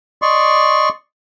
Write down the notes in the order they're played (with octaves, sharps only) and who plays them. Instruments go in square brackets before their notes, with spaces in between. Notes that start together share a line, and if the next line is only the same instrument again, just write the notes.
[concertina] D5 D#5 C6 C#6